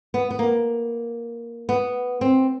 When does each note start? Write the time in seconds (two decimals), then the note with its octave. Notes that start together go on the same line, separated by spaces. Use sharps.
0.14 B3
0.30 B3
0.39 A#3
1.69 B3
2.21 C4